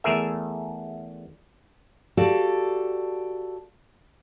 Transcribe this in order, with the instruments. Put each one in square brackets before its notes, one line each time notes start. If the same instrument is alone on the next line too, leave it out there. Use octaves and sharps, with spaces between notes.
[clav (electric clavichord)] E2 A3 G#4 A#4 E5
[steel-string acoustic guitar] F#4 G4 A4 D5 F5